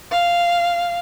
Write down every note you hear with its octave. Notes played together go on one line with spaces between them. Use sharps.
F5